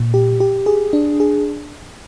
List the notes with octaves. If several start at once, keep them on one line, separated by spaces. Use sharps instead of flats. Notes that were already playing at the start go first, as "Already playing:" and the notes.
Already playing: A#2
G4
G4
G#4
D4
G#4